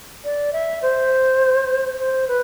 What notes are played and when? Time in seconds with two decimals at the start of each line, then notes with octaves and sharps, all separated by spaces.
0.24 D5
0.53 E5
0.82 C5
1.99 C5
2.28 B4